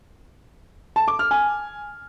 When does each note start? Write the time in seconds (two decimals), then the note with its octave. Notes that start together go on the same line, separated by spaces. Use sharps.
0.96 A5
1.08 D6
1.19 F6
1.31 G#5